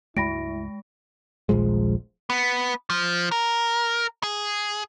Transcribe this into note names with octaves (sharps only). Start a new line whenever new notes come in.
C#2 G2 G#3 A3 E4 B5 A#6 D7
D#1 A#1 F3 G#3
B3
F3
A#4
G#4